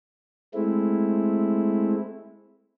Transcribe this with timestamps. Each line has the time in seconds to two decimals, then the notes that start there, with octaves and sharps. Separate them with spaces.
0.54 G#3 A3 C4 E4